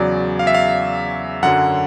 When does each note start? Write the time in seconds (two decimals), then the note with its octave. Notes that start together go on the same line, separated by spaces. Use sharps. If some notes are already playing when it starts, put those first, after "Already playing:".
Already playing: E2 C#3 F#3 D5
0.39 F5
0.47 E5
0.54 F5
1.43 F#2 D3 F#3 F#5